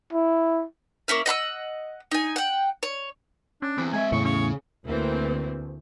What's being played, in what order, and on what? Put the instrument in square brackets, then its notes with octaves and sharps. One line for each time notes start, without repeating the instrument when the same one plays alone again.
[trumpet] E4
[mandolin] A#3 C#4 E4 F5
D#5 F#5 B5 E6
D#4 G#5
F#5 G5
C#5
[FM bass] C#4 [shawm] D4
[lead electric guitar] E2 [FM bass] C4
[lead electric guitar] G#3 E5 [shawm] G#5
[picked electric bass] E2 A2 [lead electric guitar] C#3 [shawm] C#6
[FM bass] C#4 [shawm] C#5
[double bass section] D2 [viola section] E3 A#3 C4